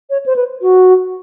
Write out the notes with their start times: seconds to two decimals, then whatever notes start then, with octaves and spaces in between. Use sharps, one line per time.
0.10 C#5
0.26 C5
0.36 B4
0.62 F#4